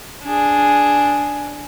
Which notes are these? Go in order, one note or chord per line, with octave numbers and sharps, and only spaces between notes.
D4 G#4